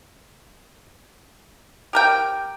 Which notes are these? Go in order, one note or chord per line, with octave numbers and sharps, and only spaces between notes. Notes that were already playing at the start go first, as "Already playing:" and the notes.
G4 A#4 G5